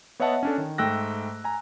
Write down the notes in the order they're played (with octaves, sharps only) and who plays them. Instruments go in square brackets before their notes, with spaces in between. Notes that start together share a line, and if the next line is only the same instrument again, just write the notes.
[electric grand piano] B3 C#5 D#5 E5 F#5 A5
C#4 D4 A4
D#3
G#2 A3 G5 E6 F#6 A#6
G#5 A#5